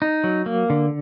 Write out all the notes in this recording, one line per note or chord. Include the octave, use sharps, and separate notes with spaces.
D#4
F#3
A#3
D3